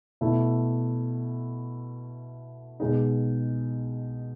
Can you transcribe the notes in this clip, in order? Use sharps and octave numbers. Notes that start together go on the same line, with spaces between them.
B2 A3 E4
B2 G#3 D#4